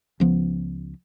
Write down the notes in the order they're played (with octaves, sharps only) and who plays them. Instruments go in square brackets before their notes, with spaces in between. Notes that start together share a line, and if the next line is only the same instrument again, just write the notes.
[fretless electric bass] C#2 F3 B3